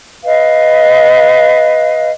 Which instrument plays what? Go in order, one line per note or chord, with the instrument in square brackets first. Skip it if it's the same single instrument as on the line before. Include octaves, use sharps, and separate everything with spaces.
[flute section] B4 D#5 F5